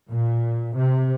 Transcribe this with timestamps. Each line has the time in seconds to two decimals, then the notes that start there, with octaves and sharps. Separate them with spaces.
0.10 A#2
0.77 C3